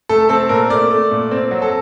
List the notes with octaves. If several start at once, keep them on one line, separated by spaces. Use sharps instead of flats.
A3 A4
C4 A4
A#2 A#4
A3 D5
A3
A#2
C4
F#3
A4